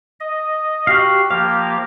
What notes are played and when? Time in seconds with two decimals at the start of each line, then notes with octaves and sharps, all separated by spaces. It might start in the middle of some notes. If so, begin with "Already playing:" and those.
0.20 D#5
0.87 F#4 G4 F5
1.31 F3 A#3 G4 F5